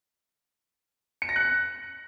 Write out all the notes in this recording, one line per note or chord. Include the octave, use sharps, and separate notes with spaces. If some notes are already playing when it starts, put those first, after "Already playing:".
C#7
A#6
F#6